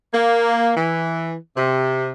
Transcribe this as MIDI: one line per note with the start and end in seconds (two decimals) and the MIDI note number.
0.14 0.72 58
0.76 1.34 52
1.55 2.09 48